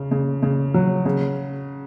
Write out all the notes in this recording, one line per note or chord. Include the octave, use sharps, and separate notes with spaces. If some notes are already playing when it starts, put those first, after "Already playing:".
Already playing: C#3
C#3
C#3
F#3
C#3